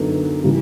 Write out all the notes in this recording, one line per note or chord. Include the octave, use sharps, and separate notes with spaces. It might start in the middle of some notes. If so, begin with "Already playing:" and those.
Already playing: F#2 D3 F#3 B3 D#4
C#3 E3 G3